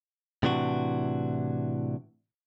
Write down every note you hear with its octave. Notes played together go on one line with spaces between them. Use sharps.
A2 C3 E3 D4 F#4